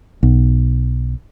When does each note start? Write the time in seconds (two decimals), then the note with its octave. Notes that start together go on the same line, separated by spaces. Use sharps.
0.23 B1